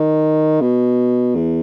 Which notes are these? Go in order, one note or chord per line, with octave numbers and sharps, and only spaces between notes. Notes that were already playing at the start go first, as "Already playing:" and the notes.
Already playing: D#3
B2
E2